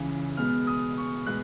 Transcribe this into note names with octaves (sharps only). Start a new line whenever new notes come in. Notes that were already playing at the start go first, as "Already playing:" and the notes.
Already playing: C#2 C#3 E3
B2 G#3 B3 F6
D#6
C#6
B2 G#3 B3 F#6